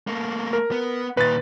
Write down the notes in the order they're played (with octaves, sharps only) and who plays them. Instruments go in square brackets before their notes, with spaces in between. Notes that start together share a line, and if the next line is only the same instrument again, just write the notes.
[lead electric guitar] A3 A#3
[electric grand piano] A#4
[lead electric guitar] B3
[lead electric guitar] A#2 D#3 [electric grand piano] B4 A6